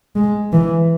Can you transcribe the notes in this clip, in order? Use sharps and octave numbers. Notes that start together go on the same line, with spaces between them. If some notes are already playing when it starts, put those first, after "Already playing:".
G#3
E3